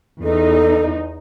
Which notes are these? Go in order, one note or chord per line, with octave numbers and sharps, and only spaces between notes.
E2 D#4 A4